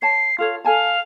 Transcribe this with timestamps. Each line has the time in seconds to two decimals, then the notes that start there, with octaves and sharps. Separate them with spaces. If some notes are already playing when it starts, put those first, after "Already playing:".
0.02 C#5 A5 C7
0.38 F4 A4 C#5 F5
0.64 A4 F5 G#5 A5